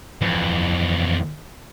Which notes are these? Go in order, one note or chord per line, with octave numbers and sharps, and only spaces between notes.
F2 E3